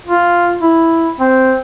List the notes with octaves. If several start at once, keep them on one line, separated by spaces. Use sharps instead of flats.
F4
E4
C4